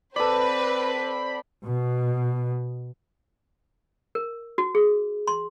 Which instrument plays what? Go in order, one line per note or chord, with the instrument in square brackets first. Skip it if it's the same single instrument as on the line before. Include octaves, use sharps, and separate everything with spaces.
[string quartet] C4 C5 [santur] A4 D5 [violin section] B4 [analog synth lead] B5
[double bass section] B2
[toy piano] A#4
F#4
G#4
C6